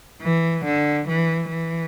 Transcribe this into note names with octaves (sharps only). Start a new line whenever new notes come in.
E3
D3
E3
E3